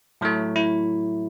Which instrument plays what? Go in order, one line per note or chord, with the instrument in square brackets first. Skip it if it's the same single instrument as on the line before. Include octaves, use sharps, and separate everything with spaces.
[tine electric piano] A2 F#3 A3
E4